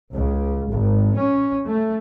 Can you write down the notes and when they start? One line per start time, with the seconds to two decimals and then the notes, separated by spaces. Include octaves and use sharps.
0.13 C#2
0.71 G#1
1.17 C#4
1.66 A3